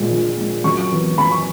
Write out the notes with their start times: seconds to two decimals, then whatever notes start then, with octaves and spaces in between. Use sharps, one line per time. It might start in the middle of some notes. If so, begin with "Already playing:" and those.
Already playing: A#1 A#2 G#3
0.10 A#1
0.36 A#2 G#3
0.64 F#2 C#6
0.90 E3 B3
1.17 F#2 B5
1.32 C#6